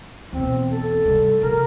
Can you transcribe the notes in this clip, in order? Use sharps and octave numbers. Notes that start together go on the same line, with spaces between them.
E2 B2 C4
A4
C3 G3
C3 E3 A#4